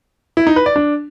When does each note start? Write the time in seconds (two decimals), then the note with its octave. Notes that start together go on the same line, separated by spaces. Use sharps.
0.37 E4
0.47 D#4
0.56 B4
0.66 D5
0.76 D4